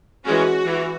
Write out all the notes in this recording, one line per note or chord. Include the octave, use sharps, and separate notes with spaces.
E3 G#3 C#4 F#4
E3